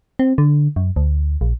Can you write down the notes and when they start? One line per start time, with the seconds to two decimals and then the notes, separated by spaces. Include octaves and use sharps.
0.19 C4
0.38 D3
0.76 F#2
0.96 D2
1.41 A#1